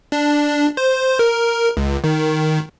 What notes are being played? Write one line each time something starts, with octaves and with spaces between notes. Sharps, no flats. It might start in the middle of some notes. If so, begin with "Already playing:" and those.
D4
C5
A#4
C#2
D#3